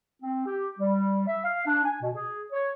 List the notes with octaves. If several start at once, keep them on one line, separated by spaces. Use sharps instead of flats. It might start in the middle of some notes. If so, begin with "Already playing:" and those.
C4
G4
G3
E5
F5
D4
G#5
B2
G#4
C#5